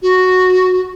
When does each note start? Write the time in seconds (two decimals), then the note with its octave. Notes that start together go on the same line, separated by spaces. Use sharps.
0.02 F#4